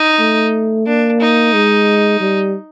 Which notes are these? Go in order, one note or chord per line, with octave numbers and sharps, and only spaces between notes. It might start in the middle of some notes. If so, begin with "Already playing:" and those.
Already playing: D#4
A3
A#3 D4
D#4
G#3
G3